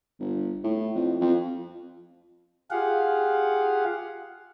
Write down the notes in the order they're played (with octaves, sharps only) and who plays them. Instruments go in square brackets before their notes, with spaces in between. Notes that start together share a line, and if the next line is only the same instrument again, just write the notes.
[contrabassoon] G1
A2
F2
F2
[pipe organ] F4 G4 G#4 F5 F#5